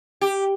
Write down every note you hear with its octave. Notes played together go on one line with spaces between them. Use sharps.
G4